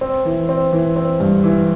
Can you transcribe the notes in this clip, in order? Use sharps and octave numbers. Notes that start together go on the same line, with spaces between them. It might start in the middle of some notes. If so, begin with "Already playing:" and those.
C4
E3
C4
E3
C4
G2
E3